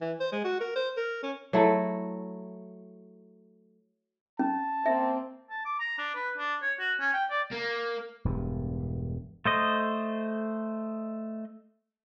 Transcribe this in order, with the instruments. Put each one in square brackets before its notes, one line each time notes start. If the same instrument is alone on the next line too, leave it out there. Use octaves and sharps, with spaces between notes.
[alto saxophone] E3
C5
G#3
F#4
A#4
C5
A#4
C#4
[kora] F#3 A3 E4
[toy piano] C#4 [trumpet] A5
[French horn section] A#3 C4 [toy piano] E5
[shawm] A5
D6
A#5
D4
B4
D4
C#5
F#4
C#4
G5
D5
[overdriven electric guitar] A#3
[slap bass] E1 G2
[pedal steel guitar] A3 C5 D#5